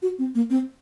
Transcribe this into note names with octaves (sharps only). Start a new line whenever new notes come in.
F#4
C4
A#3
C4